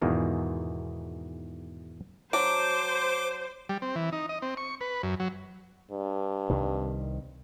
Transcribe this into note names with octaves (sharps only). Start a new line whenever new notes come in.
E2 G#2 B2 D#3 F4
F#3 D4 C5 D6
G3
C4
E3
D#4
D#5
C4
C#6
B4
F#2
F#3
G2
C2 C3 D#3